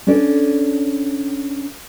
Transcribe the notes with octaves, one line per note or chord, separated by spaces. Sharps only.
C#4 D4 A4 D5